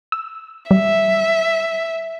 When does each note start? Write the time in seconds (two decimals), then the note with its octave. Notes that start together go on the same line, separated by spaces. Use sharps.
0.12 E6
0.71 G3 E5